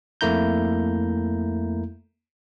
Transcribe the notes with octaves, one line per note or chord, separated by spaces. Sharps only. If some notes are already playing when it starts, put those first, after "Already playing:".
F2 A3 A#3 E4 A#5 G6